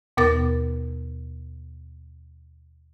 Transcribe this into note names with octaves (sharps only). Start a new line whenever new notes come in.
D#2 B2 B3 A#4 D6 A6